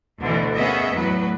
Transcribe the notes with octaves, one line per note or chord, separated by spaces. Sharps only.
D2 B2 D3 E3
A#3 B3 C#4 G#4 D#5 E5
E2 A2 F#3 B4